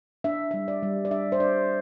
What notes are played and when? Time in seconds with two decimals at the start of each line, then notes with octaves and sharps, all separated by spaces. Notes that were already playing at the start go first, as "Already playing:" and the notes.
0.24 D4 E5
0.51 G3 E5
0.68 D5
0.83 G3
1.05 D5
1.11 D4 E5
1.32 C5
1.40 D4 D5